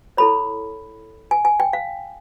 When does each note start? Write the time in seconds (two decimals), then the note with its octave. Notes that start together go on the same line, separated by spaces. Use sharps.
0.17 E4 A4 C#5 B5
1.31 G#5
1.45 G#5
1.60 G5
1.73 F5